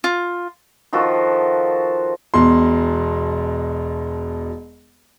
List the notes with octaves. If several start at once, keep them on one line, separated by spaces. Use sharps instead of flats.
F4
D#3 F3 F#4 A4
E1 B2 C6